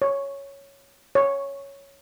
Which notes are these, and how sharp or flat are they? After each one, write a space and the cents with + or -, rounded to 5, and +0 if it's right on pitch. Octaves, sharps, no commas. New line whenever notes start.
C#5 +0
C#5 +0